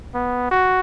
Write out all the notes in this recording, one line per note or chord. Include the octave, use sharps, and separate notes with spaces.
B3
F#4